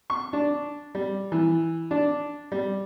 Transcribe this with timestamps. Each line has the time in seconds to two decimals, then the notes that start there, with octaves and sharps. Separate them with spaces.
0.10 C#6
0.33 D4
0.95 G3
1.32 E3
1.91 D4
2.52 G3